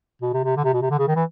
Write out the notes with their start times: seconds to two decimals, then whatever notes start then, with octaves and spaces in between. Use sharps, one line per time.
0.22 B2
0.33 C3
0.44 C3
0.56 D3
0.64 C3
0.73 B2
0.82 C3
0.90 D3
0.99 C#3
1.08 D#3
1.16 E3